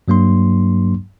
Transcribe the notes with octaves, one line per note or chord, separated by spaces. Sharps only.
G2 F#3 A#3 D4 C6